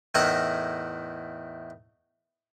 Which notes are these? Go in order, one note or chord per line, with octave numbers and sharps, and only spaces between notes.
E2 A2 D#4 A#4 E5 F#5